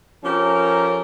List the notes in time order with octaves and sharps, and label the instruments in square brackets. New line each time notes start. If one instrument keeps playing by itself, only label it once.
[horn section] F3 C#4 G4 A4 A#4